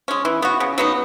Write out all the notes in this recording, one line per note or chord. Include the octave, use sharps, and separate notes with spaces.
G#3 C#4
E3
B3 F#4
C#3
F#3 B3 D#4